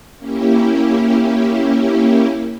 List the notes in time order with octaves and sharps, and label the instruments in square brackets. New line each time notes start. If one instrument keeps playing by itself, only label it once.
[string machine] A#3 C#4 E4 G4